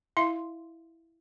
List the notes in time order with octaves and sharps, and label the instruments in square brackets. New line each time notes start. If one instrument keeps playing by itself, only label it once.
[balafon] E4 E5 F5 C6